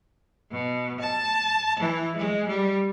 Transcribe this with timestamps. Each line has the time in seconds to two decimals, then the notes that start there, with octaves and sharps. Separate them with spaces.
0.51 B2
1.00 A5
1.79 E3
2.16 G#3
2.47 G3